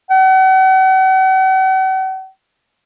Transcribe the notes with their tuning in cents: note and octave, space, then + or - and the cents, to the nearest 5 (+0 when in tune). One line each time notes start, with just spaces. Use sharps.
F#5 +40